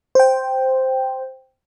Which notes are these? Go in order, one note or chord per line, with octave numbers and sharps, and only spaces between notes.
C5 G5